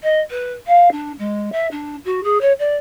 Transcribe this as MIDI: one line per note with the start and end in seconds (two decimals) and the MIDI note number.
0.03 0.20 75
0.30 0.53 71
0.67 0.91 77
0.91 1.12 62
1.18 1.49 56
1.52 1.67 76
1.71 1.96 62
2.05 2.23 66
2.23 2.40 68
2.41 2.52 73
2.59 2.75 74